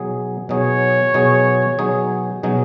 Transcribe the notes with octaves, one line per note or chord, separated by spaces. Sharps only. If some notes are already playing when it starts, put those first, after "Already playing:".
Already playing: B2 F#3 D#4 G#4
B2 F#3 D#4 G#4 C#5
B2 F#3 D#4 G#4
B2 F#3 D#4 G#4
B2 F#3 D#4 G#4